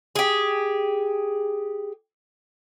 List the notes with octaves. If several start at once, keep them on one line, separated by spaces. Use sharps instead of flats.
G4 G#4